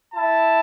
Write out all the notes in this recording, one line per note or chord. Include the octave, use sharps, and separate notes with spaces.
E4 A5